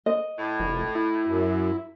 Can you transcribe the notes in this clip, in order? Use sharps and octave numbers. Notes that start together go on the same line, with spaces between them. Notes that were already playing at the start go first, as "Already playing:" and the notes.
D#5
A2
F1
E4
F#2